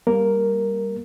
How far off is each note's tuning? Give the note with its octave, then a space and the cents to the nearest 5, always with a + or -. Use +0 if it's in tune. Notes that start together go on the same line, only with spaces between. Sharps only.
G3 +0 A#3 +0 A#4 +0